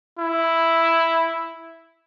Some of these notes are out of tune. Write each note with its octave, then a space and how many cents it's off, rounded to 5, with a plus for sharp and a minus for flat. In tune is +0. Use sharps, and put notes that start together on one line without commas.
E4 +0